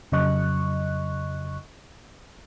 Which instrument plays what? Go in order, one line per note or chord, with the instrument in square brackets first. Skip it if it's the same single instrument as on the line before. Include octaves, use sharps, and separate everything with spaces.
[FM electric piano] F2 C#3 F#3 D#5 C#6 F#6